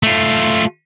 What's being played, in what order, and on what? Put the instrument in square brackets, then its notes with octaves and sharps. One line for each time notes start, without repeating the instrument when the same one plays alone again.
[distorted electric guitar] A3 F4